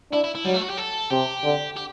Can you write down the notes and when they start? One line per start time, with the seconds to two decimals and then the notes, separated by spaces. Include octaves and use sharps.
0.12 D4 E4
0.24 E4
0.35 E4
0.45 F#3 G3
0.54 A3
0.62 F#4
0.70 G4
0.78 A4
1.11 C3 G4
1.44 D3
1.77 G4